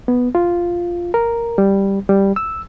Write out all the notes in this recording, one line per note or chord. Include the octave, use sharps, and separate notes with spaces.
B3
F4
A#4
G3
G3
E6